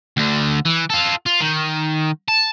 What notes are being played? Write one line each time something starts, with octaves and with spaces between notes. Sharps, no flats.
D2 D3
E3
F4 A4
F4
D#3
A5